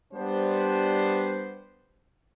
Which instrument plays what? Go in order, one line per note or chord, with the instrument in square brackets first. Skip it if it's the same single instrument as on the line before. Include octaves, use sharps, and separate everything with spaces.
[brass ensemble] G3 B3 D4 G4 C5